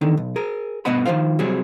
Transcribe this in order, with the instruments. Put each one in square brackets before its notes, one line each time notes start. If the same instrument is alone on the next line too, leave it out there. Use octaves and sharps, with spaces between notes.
[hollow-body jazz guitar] E2 D3 D#3
B1
G#4 A#4
G2 B2 B3 D#5 F#5 B5
D#3 F3 F4 C5 F5
C2 F#3 G3 C4 G#4